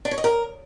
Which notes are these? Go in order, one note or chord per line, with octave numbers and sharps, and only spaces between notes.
D4
C#5
D#5
A#4